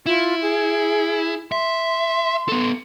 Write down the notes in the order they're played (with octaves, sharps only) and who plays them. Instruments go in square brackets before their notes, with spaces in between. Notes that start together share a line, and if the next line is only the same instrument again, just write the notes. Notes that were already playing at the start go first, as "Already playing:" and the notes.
[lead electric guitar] E4 [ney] F4
[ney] G#4
[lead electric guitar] E5 [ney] C6
[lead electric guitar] B3 A4